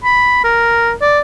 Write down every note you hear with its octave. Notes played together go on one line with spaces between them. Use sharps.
B5
A#4
D5